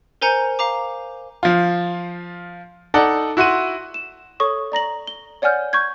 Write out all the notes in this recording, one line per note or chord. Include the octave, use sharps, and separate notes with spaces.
A#4 C5 G#5 A#5 G6 C#7
F5 A#5 D6
F3 F4
D#4 A4 D5 F#5
E4 F#4 F#5 C6 D#7
E7
A4 C#5 C#6 D#6
D5 A#5 A#6 F#7
G7
C#5 D5 F#5 G#5 F6 G6
C#6 G6 G#6